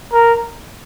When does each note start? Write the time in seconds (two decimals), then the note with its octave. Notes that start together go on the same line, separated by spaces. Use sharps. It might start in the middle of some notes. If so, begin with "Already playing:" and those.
0.12 A#4